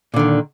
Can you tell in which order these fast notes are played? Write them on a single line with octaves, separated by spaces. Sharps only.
A#2 D3 D#3